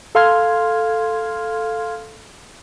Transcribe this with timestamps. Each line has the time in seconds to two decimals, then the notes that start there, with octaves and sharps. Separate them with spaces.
0.15 A4 F5 C6 F6 G#6